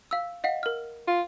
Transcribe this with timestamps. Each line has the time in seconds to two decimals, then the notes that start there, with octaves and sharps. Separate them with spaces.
0.11 F5 E6
0.44 D#5 F5 F#5
0.63 A#4 F6
1.07 F4